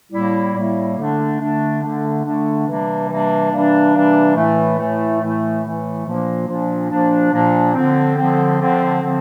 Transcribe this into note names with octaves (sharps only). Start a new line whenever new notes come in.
A2 G3 A#3 E4
A2 G3 A#3 E4
D3 A3 D4
D3 A3 D4
D3 A3 D4
D3 A3 D4
C3 E3 G3 A#3 D4
C3 E3 G3 A#3 D4
C3 E3 G3 A#3 D4
C3 E3 G3 A#3 D4
A2 E3 A3
A2 E3 A3
A2 E3 A3
A2 E3 A3
A#2 F3 A#3 D4
A#2 F3 A#3 D4
A#2 F3 A#3 D4
A#2 F3 A#3 D4
D3 F3 C4
D3 F3 C4
D3 F3 C4
D3 F3 C4